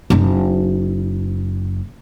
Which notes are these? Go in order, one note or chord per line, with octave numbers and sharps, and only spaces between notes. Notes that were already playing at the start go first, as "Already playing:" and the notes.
F#1 D#4